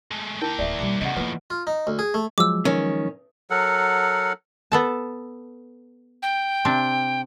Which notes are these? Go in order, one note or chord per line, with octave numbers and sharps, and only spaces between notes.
G#3 A3
A#3 E4 A#4 G5 A5
D1 E3 D5 E5
B2 G3 D6
E2 A2 C#3 D#5 F#5
F3 A#3 B4
F4
D#4
D2
G#4
A3
F3 F#3 G#3 D6 E6
D#3 C#4
F#3 A4 A#4 F#5
B3 A4 A5
G5
C3 C4 D4